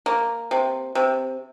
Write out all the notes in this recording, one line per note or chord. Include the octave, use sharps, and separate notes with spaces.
A#3
C3
C3